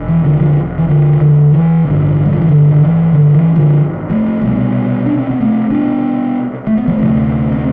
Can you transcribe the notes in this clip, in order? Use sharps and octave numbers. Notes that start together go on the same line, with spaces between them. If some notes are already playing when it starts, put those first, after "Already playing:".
Already playing: E1 B2
E3
D3 F3
D3 F3
E3
D3 F3
D3
E3
A1 G2 D3 E3
G3
F3
E3
D3
D3
E3
D3
E3
D3 F3
F3 A3
C2 B2 G3 B3
D4
C4
B3
A3 C4
B3 D4
A3
B3
F3 A3
D2 C3 A3 C4
C4